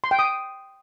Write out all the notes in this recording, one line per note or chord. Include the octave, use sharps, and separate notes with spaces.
C6
G5
D#6